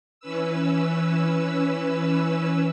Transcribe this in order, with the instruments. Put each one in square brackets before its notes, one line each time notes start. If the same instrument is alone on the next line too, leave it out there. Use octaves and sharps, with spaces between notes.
[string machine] E3 C#4 B4 E6